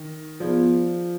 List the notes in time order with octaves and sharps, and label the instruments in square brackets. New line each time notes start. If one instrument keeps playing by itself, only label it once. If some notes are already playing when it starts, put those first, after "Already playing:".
Already playing: [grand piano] D#3
[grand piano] F3 [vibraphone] B3 F4 G#4 D5